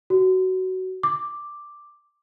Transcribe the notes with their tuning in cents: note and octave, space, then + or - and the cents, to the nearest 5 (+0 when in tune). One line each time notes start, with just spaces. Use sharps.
F#4 +15
D6 +5